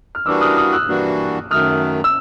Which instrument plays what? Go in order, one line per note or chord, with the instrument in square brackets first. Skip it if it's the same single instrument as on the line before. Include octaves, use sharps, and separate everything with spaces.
[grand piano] F6
[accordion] E3 G3 A#3 D4 F#4 [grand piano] D6 E6
[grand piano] D#6 F6
D#6 F6
E6 F#6
[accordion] E3 G3 A#3 D4 F#4
[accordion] F#2 D#3 F#3 A3 [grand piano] D#6 F6
[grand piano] E6